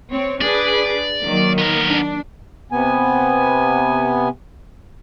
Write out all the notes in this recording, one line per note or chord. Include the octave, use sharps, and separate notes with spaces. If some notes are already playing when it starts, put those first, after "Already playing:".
C4 C#5
D4 G#4 B4 D5
D#3 F#3 A#3
B3 A#4
D4
C3 B3 G#5